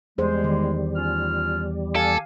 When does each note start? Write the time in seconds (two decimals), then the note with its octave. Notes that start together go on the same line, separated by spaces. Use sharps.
0.18 E2 G3 G#3 G#4 C5
0.44 D#3
0.96 C#4 F4 F6
1.96 G4 A4 F5 G#5